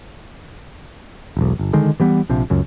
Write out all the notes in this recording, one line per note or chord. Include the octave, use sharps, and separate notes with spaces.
E1 B1
G1
D3 D#3 G#3
E3 G3 B3
A#1 C3 F3
C#2 F#2 C#3